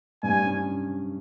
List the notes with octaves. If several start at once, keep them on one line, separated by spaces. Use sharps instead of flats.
G2 G#5
C#4